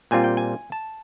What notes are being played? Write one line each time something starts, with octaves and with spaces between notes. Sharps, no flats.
A#2 G3 C4 F4 G#5
G5
G#5
A5